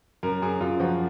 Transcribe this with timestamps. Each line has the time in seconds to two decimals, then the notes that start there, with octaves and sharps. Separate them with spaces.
0.23 F#2 A#4
0.42 F#2 G#4
0.61 F#2 F4
0.80 F3 F#4